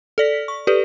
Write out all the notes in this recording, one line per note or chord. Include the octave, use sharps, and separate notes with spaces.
A4 D5 B6
C#6
G4 A4 B4 D5